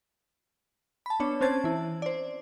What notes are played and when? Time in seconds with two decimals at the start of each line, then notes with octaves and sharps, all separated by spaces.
1.06 A5 B5
1.20 B3 D4 C#5
1.41 C4 C#4 C5 A5 G#6
1.64 E3 E4
2.02 C5 D5